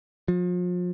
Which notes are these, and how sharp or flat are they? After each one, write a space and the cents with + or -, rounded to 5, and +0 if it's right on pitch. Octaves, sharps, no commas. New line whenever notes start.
F3 +35